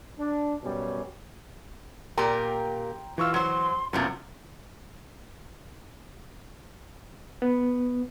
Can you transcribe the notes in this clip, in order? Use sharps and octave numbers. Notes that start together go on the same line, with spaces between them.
D4
F#2 B2 G3 C#4
A#2 G4 A#4 G5 A#5 C6
E3 F4 C#6 E6
F#3 C5 C6
F#2 A2 C3 B3 F4
B3